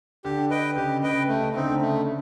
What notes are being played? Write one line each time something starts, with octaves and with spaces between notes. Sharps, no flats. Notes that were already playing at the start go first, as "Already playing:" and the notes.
D3 G4
B4 D#5 G5
C#3 G4
C#3 B4 D#5 G5
A3
C#3
D3 C4 D#4
C#3
A3